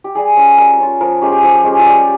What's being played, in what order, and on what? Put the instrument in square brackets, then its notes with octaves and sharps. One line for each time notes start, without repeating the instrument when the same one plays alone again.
[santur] G4
G3 G#4
C#4 F4
G3 A#4
C#4 F4
F3 A#4
G#3 C#4 G4
G4
F3 G4
G#3 C#4
F4
G3 G4